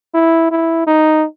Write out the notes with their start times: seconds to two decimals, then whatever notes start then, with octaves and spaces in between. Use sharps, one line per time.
0.14 E4
0.51 E4
0.87 D#4